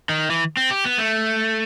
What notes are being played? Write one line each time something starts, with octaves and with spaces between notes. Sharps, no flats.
D#3
E3
C4
G4
B3
A3